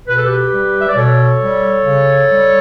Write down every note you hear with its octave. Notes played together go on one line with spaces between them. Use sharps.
B2 B4
A4
G4 B4
G3
E5
D5
B2 A4 C#5
G3
C#3
G3